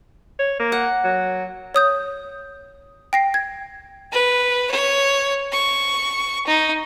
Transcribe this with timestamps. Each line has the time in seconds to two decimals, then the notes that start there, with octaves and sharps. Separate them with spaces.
0.39 C#5
0.59 A#3
0.72 F#5
1.04 F#3
1.74 C#5 D#6 G6
3.13 G5 A#6 C7
3.34 G#6
4.12 B4
4.71 C#5
5.52 C#6
6.47 D#4